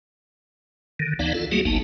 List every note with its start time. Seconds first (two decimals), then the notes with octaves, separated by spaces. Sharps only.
0.99 D3 D#3
1.19 D2 E3 B3 D#4 D5 F5
1.34 F4 A4
1.52 F#3 G3 A3 A#3 F#4 G#4
1.65 G#1 C#2 A#3 B3 D#4 A5